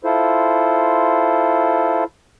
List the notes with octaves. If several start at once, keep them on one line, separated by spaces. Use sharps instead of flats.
E4 F4 A4 C5